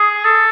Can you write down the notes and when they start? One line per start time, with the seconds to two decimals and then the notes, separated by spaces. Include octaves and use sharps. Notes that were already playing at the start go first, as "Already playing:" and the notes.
Already playing: G#4
0.25 A4